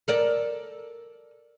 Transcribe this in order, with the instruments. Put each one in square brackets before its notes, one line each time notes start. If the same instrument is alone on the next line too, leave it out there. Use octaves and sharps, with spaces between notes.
[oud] A4 A#4 D5